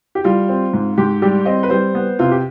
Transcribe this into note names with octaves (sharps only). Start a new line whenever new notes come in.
G4
G3 F4
C4
G#2
G#2 G4
G3 G4
C4 D#5
B4
G3 C5
B3
C3 F4
G4